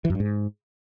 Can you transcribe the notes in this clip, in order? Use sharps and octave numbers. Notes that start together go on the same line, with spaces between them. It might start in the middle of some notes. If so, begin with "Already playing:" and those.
E3
F#2
G2
G#2